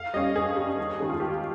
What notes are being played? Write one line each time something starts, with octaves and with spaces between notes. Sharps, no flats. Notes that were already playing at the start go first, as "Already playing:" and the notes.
Already playing: F5
G3 C#4 D#5
G2 G#4
G3 C#4
D#2
D#3 G#3 C#4
F4
D#2 G4